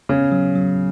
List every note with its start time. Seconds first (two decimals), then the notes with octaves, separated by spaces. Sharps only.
0.09 C#3 B3
0.32 F#3
0.55 F#3